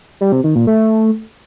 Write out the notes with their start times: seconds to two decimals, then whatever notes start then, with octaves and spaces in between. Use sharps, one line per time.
0.21 G3
0.32 C3
0.44 D#3
0.55 A#2
0.67 A3